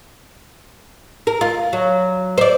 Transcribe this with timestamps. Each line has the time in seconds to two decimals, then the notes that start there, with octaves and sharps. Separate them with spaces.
1.27 A#4
1.41 F4
1.73 F#3
2.38 C5 D5